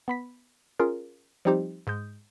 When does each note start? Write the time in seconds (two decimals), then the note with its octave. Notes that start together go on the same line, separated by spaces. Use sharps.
0.08 B3 B5 B6
0.79 C#4 F4 G#4 A#4
1.45 F3 G3 C4 D#4 G4 C5
1.87 G#2 G#3 D#6 G6